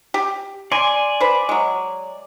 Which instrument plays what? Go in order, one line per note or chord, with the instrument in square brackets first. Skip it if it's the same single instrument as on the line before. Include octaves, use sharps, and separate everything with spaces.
[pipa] G4
[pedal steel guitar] D5 G#5 [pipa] C6
[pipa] B4 C5
F#3 G#3